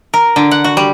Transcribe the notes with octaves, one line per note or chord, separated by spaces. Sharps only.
A#4
D3
F#5
F#4
G3